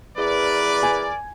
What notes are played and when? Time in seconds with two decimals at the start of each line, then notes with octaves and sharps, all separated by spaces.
0.18 E2 A#4 B4 D5
0.83 G#5